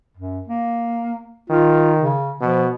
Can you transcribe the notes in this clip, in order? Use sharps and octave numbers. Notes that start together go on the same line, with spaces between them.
F#2
A#3
D#3 F4
C#3
B2 F3